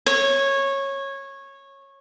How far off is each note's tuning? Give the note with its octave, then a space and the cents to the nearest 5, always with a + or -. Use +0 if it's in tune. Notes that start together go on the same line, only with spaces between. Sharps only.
C#5 -15